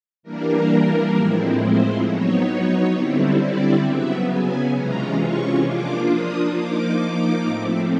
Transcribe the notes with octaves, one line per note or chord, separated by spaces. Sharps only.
E3 G3 A#3 D4 A#4
A2 F3 G#3 C4 E4
C5
F#3 B3 D#4 C#5
D3 G3 C4 E4
D5
C#3 F#3 B3 E5
G#5
C3 E3 G#3 C#4 F4 A#5
C#6
F3 A#3 D4 F4 D6
D#6
F3 A#3 D#4 D6
A2 F3 A3 C4